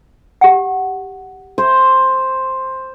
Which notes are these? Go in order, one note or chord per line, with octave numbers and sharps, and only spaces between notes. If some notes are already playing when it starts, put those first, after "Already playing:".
G4 F#5
C5